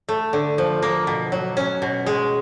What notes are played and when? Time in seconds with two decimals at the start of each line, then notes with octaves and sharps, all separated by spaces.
0.09 A3
0.33 D3
0.58 F3
0.82 A#3
1.07 B2
1.32 F#3
1.57 C#4
1.82 B2
2.06 G#3